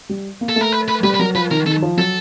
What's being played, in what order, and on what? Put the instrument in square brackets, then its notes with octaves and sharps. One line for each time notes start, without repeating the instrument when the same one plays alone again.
[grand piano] G3
A#3
[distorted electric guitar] A4
[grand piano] A3 [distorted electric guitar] A#4
[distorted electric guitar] B4
B4
[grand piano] G3 [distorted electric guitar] B4
[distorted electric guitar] B4
[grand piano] F#3 [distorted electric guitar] A#4
[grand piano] F3 [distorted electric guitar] B4
[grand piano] D#3 [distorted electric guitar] A#4
[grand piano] D#3 [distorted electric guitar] A4
[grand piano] F3
[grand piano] F#3 [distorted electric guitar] A4